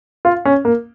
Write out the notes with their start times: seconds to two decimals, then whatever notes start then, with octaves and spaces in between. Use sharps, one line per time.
0.25 F4
0.45 C#4
0.65 A#3